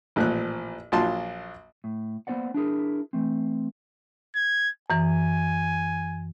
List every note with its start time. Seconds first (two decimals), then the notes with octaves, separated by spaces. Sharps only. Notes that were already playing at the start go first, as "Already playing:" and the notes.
0.16 A1 A#2 F3 F#6
0.92 A#1 F#3 F4 A5 C6
1.84 A2
2.27 A#3 B3 C#4 C5 D5 F#5
2.54 D4 E4 G#4 A#4
3.13 E3 A3 C4
4.35 G#6
4.90 F#2 E3 G#5